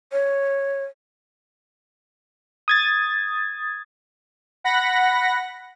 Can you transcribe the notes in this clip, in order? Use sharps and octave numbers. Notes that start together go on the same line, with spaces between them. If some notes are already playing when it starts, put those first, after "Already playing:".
C#5
D#6 G#6 A6
F#5 B5 A#6